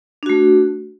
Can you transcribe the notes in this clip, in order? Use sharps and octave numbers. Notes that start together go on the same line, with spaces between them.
A3 D4 F#4